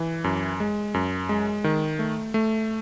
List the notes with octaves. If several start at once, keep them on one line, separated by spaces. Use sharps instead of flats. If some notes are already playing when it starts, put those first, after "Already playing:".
Already playing: E3
F#2
G#3
F#2
G#3
D#3
A3
A3